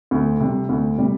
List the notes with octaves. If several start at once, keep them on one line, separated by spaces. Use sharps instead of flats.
D2
C3 G3
D2
C3 G3